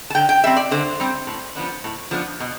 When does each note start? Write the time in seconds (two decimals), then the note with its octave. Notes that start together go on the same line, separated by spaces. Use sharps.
0.10 A5
0.15 D3 G5
0.29 G5
0.43 G3 C4 E5
0.56 D5
0.71 D3 C5
1.00 G3 C4
1.27 A2
1.55 F3 B3 D4
1.84 A2
2.11 F3 B3 D4
2.40 B2